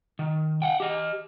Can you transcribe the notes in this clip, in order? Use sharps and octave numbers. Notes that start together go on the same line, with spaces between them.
D#3
F#5 G5
G4 D#5